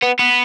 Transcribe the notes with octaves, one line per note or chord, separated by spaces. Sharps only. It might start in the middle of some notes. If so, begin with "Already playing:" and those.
B3
B3